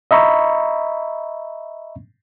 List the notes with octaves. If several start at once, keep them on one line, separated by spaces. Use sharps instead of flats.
D#5 E5 A#5 B5 C#6